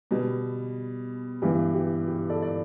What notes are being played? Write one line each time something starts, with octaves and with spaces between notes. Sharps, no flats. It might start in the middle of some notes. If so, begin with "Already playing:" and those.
B2 G3 B3
G2 E3 B3 G4
G4
G4
A4 D5
D5